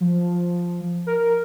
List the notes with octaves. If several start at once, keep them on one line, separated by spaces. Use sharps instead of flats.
F3
A#4